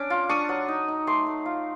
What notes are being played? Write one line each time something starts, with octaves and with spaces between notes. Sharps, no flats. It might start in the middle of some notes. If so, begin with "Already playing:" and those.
Already playing: C#4 D4 D6
F4
D4 C#6 D#6
F#3
D#4
D#4
A3 C6 D6
A3
F4